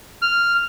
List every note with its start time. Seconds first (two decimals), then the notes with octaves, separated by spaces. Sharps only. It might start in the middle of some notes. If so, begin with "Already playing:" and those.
0.22 F6